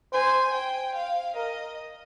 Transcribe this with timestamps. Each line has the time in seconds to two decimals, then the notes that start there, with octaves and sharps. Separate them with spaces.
0.13 C5 G#5
0.54 G5
0.95 F5
1.36 A#4 D#5